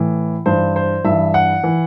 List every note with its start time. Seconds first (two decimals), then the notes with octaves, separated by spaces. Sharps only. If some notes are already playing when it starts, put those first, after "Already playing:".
Already playing: A2 E3
0.46 G2 E3 C5
0.76 C5
1.05 G2 E3 E5
1.34 F#5
1.64 E3